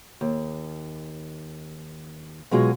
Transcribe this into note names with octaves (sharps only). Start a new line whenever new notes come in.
D#2
B2 F#3 G#3 F4 G#4